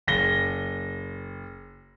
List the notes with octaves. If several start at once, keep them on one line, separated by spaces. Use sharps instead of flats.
F#1 A#6 G7